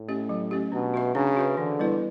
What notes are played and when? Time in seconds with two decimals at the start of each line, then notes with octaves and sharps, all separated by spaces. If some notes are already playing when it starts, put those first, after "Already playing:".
Already playing: A2
0.08 A3 C#4 G4
0.29 F#3
0.51 A3 C#4 G4
0.72 B2 D4
0.94 F#4 B4 E5
1.15 C#3 D4
1.36 F#4 B4 E5
1.57 D3 E3
1.79 G3 B3 E4 B4